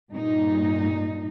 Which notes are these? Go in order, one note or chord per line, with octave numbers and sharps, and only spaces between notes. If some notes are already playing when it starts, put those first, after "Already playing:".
G2 A#2 D#4